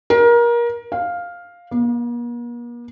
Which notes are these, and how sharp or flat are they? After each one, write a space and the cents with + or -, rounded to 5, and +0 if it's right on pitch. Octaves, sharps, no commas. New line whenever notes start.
A#4 +25
F5 +5
A#3 +45